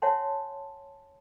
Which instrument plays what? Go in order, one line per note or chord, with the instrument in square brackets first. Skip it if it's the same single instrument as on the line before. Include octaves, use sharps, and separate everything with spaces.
[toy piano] C#5 E5 F#5 G#5 A5 C6